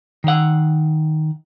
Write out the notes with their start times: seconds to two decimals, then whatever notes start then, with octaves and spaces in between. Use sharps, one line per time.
0.24 D#3 F#5